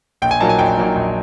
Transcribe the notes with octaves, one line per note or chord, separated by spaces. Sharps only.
A#1 G5
G#5
A#2 F#3 A#3 D#4 A5
G#5
A#1 G5
A#2 F#3 A#3 D#4
A#1